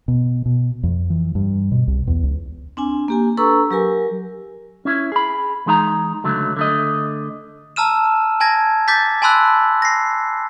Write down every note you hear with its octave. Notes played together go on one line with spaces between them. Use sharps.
B2
B2
F2
E3
G2
B2
C2
E2
C#2
C4 D4 G#5
A#3 G4 G#5
D4 A4 B4 A#5 C#6 E6
F#3 G4 A#4 G#5
C#4 E4
G#4 B5
E3 G#3 D#4 F5 A#5
C#2 D3 F#3 A3
D3 A3 D#5
A5 A#5 E6 F6 D#7 E7
G#5 A5 G#6 A#6
D6 G6 A6 B6
G#5 A5 B5 C6 E6 F#6
A#6 C7